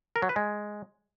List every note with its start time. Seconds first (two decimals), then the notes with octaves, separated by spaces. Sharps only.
0.16 A#4
0.22 F#3
0.29 B4
0.36 G#3